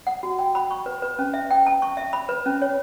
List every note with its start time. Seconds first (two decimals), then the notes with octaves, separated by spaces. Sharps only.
0.07 F#5
0.23 F#4
0.39 G5
0.55 B5
0.71 C#6
0.86 B4
1.02 B4
1.19 C#4
1.34 E5
1.51 G5
1.67 A5
1.82 C#6
1.97 E5
2.13 B5
2.29 B4
2.46 C#4
2.62 C#5